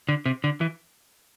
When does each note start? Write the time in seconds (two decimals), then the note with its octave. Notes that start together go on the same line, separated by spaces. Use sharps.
0.09 D3
0.26 C3
0.44 D3
0.61 E3